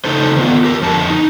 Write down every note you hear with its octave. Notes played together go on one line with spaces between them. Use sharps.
C#3 D#4 A4 C5
D#3 B3 F4
G4 A#4
F2 D3 A5
D#4